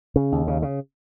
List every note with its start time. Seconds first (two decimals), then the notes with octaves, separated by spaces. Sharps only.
0.16 C#3
0.32 D#2
0.47 C#3
0.62 C#3